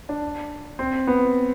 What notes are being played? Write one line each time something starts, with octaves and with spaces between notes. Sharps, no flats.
D4
C4
B3